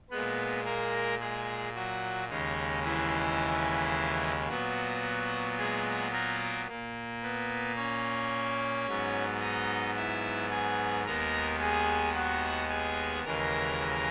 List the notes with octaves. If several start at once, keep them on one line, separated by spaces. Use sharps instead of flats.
A#2 G#3 B3 B4
A#3 A#4
G#3 G#4
F#3 F#4
D#2 C#3 G#3 D#4
E3 E4
A#2 F#3 B3 F#4
G#3 G#4
A#3 A#4
A#2 A#3
B3 B4
C#4 C#5
G#2 F#3 B3
D#4 D#5
E4 E5
G#4 G#5
D#2 D#3 G#3 B3 A#4 A#5
G#4 G#5
F#4 F#5
G#4 G#5
D#2 C#3 E3 G#3 A#4 A#5